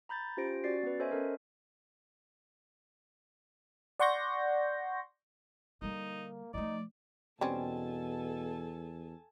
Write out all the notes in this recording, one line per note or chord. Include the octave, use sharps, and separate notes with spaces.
A#5 B5 G6 A6
C#4 F4 G4 C5 A#6 D7
C#4 F#4 D5 A6 C7
B3 C#4 B4
A4 C5 C#5 D#5 E5 G#5
C#4 A4 A#4
D5 F#5 C6 C#6 G6 A#6
D3 G3 A#3 D#4
F3 A3 D#4 D5
E2 B2 G3 C4 C#4 A4 G#5 A5